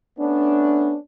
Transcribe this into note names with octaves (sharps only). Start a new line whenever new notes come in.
A3 B3 C#4 D4